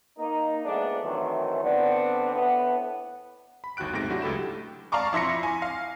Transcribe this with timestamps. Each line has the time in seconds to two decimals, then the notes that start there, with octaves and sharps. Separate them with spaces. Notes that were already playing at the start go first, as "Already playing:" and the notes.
0.18 A#3 D#4
0.65 F3 G#3 A3 B3 D4
1.03 D#3 E3 F#3 A3 C4 C#4
1.63 D3 B3 C4 D4
2.33 A2 B3
3.64 B5
3.77 G1 D#2 F#4 G5 F#6 D7
3.93 D#2 G#2 C3 A3 A#6 D7
4.10 F#3 A3 D4 E4 F#4 G4
4.22 C#2 G4 A4 B5 E7
4.92 D5 F5 A5 A#5 C#6 D6
5.13 F2 E4 C6 A#6 C#7
5.43 G#5
5.62 F5